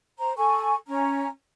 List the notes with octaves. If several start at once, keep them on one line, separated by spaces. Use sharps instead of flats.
C5 A#5
A4 G#5 C#6
C#4 A#5